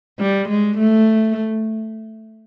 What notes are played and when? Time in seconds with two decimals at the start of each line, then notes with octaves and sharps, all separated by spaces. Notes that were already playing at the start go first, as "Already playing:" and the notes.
0.19 G3
0.49 G#3
0.78 A3